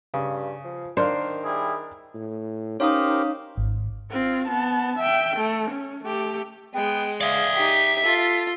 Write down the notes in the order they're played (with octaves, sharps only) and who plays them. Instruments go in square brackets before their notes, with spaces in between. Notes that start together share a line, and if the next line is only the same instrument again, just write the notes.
[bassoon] G2 [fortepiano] C#3
[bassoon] F3
[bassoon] D#3 [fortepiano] D4 A#4 F5 [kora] C5
[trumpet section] G3 E4 G#4
[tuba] A2
[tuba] C#4 [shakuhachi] D#4 [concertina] G4 A#4 C5 [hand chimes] C#5 F5 D#6
[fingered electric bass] G#1
[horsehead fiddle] C4 F4
B3 A5
E5 G5
A3
C#4
A3 G4
[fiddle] G#3 [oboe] B3 [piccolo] G5
[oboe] G#4 [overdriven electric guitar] D5 E5 [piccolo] F5
[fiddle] D#4 G4 [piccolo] B6
[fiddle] F4 [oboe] A4